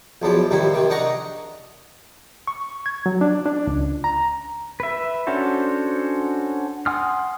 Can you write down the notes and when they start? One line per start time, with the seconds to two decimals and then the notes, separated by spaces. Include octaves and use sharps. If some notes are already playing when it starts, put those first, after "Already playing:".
0.22 B1 E2 F3 G4
0.51 A1 D#2 C3 G3 E4
0.74 C3 D#3
0.90 D4 D#4 F#5 A#5 C#6
2.47 C#6
2.86 G#6
3.06 F#3
3.21 D4
3.46 D4
3.67 C#2
4.04 A#5
4.80 B4 E5
5.27 C#4 D4 F#4 A4 C5
6.86 F#5 G#5 C6 D#6 F6